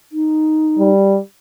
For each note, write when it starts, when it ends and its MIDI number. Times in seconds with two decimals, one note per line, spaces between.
0.12 0.91 63
0.79 1.17 55